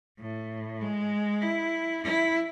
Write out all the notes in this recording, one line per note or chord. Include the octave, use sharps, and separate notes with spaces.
A2
G#3
E4
E4